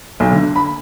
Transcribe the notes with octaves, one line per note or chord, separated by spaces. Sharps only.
B1
D3
B5